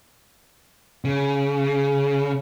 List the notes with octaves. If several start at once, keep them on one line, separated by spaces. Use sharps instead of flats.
C#3